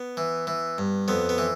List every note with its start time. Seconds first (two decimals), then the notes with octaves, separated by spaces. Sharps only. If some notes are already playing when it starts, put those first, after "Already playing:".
Already playing: B3
0.17 E3
0.47 E3
0.78 G2
1.08 F2 B3
1.29 B3
1.38 E3